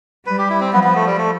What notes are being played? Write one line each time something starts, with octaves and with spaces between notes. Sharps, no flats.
G3 B4
G4
E4
C4
F3 B3
B3
A3
G3
A3